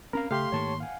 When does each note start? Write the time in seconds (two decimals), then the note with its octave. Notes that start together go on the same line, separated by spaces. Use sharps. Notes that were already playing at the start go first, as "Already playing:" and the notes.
0.13 C4 C#4 A#4 F5 A#5 B5
0.31 C#3 A3 G4 F5 C6
0.52 G#2 D#3 A#3 C#5 A5 C#6
0.80 F5 F#5 G#5